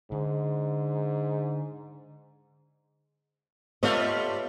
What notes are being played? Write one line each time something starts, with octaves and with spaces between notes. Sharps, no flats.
G#2 D3
G3 A3 B3 F4 C#5 D#5